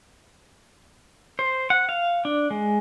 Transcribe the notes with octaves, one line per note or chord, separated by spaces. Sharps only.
C5
F#5
F5
D4
G#3